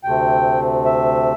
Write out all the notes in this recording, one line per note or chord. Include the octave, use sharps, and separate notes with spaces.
D2 C3 A3 C4 G5
E5